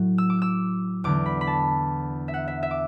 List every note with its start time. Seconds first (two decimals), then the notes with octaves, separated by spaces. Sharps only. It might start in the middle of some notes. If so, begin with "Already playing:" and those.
Already playing: A2 F#3
0.18 E6
0.30 D6
0.42 E6
1.04 E2 D3 B3 D6
1.26 B5
1.41 B5
1.47 A5
2.28 E5
2.34 F#5
2.48 E5
2.63 E5
2.71 D6